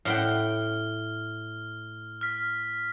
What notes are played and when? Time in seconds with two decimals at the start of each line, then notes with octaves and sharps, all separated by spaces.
0.05 A2 F#5 G5 F6 G7
2.21 F6 B6